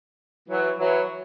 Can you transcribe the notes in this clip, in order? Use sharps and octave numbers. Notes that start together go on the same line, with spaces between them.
E3 F#3
E3 F#3